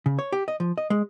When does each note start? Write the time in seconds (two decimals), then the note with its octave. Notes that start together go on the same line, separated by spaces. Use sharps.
0.06 C#3
0.19 C#5
0.32 G4
0.48 D#5
0.60 F3
0.78 D#5
0.90 G#3